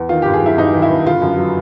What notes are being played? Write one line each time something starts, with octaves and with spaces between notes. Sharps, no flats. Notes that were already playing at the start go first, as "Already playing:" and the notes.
Already playing: E2
D#3 F4
G2 G4
G#4
F#3 E4
G2 D#4
D#3
E4
G2
D3 F4
F#2
F#3